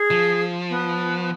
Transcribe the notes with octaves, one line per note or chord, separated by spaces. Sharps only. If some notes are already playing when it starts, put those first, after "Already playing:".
Already playing: G#4
F3
B3